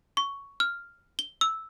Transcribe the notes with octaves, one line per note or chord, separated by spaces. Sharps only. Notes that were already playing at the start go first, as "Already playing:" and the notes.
C#6
F6
G7
E6